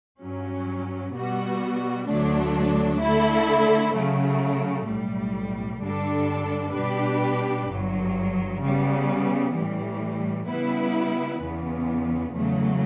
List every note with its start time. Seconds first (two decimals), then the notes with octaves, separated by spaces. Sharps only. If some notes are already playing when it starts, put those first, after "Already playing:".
0.21 G2 F#3 C#4
1.15 B2 G3 B3 F#4
2.08 D2 D3 F#3 A3 D4
3.01 D3 A3 E4 A4
3.95 C#3 F#3 A3
4.88 B1 A2 G3
5.81 G2 D3 G3 D4 A4
6.75 B2 G3 D4 G4 B4
7.68 G1 G2 F#3
8.61 C#3 G3 B3
9.55 A2 E3 G3
10.48 C#3 G3 B3 E4 B4
11.42 E2 C#3 E3 B3
12.35 E2 C#3 F#3 A3